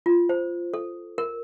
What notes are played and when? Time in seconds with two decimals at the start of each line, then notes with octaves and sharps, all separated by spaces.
0.06 F4
0.29 C5
0.74 A4
1.18 A#4